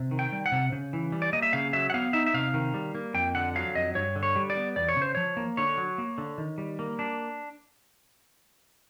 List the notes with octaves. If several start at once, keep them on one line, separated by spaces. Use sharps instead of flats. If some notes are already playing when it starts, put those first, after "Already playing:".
Already playing: C3
D#3
G5
G3
F#5
C3
C#3
E3
G3
D5
A#3 D#5
E5
C#3 F5
F#3 E5
F#5
B3 F5
D#4 E5
E5
C3 F5
D#3
G3
A#3
F2 G5
D3 F#5
F#3 F5
F2 D#5
G2 C#5
D3
C#5
G3
D5
B3
E2 D5
C#5
C#3
C5
F3 C#5
A#3
D3 C#5
F#3
A#3
D3
D#3
G3
A#3
D4